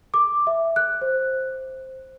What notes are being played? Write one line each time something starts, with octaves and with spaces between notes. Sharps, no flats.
D6
E5
F#6
C5